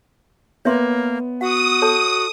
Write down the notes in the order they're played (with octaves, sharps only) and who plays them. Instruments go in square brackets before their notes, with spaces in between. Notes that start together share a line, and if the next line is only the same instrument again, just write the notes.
[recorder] A#3 [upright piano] B3 [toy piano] C#5 E5 C6
[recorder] F#4 [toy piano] F#5 [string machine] D#6
[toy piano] A4 C#5 A5